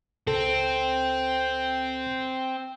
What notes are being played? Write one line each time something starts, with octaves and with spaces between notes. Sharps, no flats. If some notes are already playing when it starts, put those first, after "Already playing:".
C#2 C4 A4